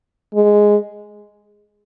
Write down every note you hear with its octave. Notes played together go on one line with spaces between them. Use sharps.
G#3